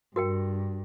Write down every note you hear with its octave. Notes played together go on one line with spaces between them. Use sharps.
G2 F#4 A#4 G5